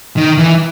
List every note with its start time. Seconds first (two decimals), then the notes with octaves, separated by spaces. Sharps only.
0.17 D#3
0.38 E3